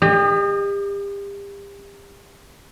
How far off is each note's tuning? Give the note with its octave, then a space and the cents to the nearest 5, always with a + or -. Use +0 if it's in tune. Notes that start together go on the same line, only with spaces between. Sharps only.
G4 +35 D#5 -30